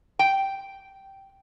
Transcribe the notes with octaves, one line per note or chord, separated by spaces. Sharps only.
G5